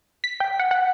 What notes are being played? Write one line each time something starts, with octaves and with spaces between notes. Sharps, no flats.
B6
G5
F#5
F#5